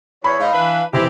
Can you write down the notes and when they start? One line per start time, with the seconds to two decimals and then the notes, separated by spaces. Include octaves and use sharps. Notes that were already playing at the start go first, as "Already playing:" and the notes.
0.24 E2 C#5 B5
0.40 G#2 D#4 F5
0.53 E3 D4 E4 B4
0.93 F1 E3 C4 E4 G4